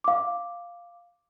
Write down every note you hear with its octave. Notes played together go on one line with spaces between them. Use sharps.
F5 D6